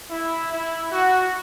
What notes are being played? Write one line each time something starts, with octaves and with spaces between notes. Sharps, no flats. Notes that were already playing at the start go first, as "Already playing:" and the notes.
E4
E4
F#4